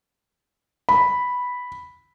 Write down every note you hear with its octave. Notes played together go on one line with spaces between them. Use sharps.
B5